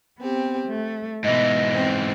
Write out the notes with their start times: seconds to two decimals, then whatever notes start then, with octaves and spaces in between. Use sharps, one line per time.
0.18 B3 C4 G4
0.66 A3
1.24 G#2 B2 E3 D#5
1.74 C4